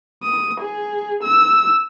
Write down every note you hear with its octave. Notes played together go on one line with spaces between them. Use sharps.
D#6
G#4
E6